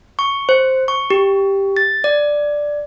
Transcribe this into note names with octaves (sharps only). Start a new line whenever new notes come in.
C#6
C5
C#6
G4
A6
D5